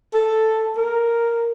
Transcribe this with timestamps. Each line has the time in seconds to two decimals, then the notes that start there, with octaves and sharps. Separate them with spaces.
0.14 A4
0.77 A#4